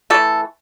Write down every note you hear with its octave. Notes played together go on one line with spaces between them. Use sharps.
E3 A3 A4